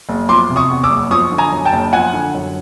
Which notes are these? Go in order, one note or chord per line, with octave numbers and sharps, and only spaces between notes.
F#1
F3 C6 D6
C3
C#6 D#6
E2
D6 E6
F#1
F3 C#6 D#6
D3
G#5 A#5
F#2
G5 A5
F#1
F3 F#5 G#5
D3
F#2